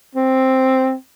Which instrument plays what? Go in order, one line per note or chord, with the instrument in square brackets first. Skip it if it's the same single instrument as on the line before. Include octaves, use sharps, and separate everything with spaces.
[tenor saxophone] C4